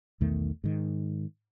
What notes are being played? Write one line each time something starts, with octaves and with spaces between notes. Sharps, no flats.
B1 E2 D#3 A3
G#2 D#3